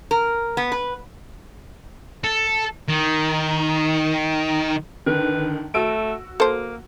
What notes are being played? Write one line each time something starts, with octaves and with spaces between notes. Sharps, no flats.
A#4
B3
B4
A4
D#3
D3 D#3 B4
A3 F#4 E6 D7
A#3 A4 C5